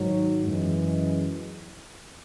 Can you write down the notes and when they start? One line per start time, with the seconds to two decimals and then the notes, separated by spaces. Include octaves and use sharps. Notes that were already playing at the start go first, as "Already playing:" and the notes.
Already playing: G#2 D#3 F#3
0.45 F#2 E3 G#3